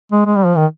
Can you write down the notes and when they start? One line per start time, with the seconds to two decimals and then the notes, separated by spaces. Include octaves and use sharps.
0.12 G#3
0.26 G#3
0.36 G3
0.46 F3
0.57 D#3